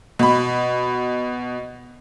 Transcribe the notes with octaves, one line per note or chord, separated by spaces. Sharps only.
B2 B5